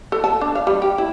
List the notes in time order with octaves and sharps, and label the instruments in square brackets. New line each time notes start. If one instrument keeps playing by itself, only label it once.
[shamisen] A4
A5
D4
F5
G3
G4
E4